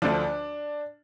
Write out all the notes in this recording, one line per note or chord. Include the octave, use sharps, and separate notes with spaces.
D2 D3 F3 D4